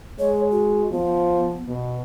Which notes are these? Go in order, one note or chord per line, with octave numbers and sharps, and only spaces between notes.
G#3 C#5
F#4
F3 B3
B2